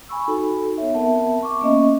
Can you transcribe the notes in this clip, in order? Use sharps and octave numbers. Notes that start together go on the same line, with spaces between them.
G#5 B5 C#6 E6
D#4 F#4 A4
B3 C#5 E5
B3 C4 A#4 E5 F#5 A5
C#6 D6
A#3 B3 C#4 D#5 E5 C#6